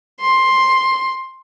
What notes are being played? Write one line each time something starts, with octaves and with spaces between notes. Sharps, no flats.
C6